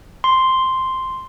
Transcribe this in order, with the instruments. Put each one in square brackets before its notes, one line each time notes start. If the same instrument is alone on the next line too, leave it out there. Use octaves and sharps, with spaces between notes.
[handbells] C6